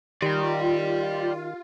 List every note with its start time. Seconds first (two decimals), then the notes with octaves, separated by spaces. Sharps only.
0.22 D#3 F4 G4 D5 G5